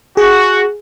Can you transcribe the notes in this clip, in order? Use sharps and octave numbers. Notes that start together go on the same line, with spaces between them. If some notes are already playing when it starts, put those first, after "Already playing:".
F#4 G#4